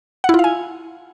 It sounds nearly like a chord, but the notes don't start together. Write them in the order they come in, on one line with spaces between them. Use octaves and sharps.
F#5 E4 F4 F5 G#5